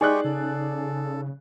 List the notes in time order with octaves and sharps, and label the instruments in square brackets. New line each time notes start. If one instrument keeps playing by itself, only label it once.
[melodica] G#3 G4 C#6 [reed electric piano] D#4 [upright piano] G#4 D5 F#6
[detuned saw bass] C#3 [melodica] A4